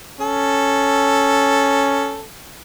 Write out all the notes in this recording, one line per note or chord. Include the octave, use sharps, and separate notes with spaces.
C#4 A4